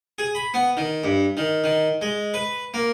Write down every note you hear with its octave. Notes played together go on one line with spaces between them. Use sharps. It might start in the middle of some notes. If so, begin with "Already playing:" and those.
G#4
B5
B3
D#3
G2
D#3
D#3
G#3
B4
A#3